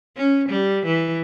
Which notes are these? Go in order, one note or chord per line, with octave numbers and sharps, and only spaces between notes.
C#4
G3
E3